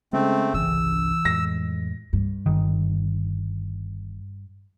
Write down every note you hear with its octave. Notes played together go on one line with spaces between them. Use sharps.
C#3 G#3 A3 C4
G1 C2 E3 C#4 E6
F2 A2 G#3 A#6
G2
G1 D#3